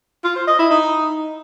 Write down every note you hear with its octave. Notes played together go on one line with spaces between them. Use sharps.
F4
C5
D#5
E4
D#4